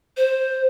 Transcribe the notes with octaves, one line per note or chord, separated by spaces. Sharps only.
C5